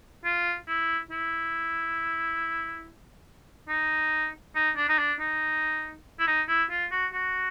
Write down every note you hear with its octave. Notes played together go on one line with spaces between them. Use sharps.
F4
E4
E4
D#4
D#4
D4
D#4
D4
D#4
E4
D#4
E4
F4
F#4
F#4